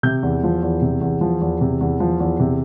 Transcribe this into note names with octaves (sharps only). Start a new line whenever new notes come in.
C3 G6
E2
F3
E2
C3
E2
F3
E2
C3
E2
F3
E2
C3